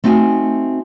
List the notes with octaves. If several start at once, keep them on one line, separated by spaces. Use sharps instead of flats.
A3 C4 D#4 F#4 G#5